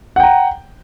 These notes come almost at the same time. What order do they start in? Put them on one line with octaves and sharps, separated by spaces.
F#5 G5 A#5